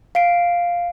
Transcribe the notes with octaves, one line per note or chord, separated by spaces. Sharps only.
F5 C7 D7